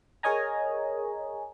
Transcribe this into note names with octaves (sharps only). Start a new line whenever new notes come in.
G#4 A#4 C#5 D#5 G#5 A#5